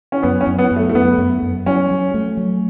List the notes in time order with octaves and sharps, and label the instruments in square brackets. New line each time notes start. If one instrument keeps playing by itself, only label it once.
[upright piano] C#4
[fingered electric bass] F#2 [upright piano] B3
[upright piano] C#4
[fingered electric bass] F#2
[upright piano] B3
[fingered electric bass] F#2
[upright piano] A3
A3
[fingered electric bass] F#2 [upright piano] B3
[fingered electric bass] F#2
F#2
[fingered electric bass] F#3 [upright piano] C#4
[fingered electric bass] F#3
A3
F#3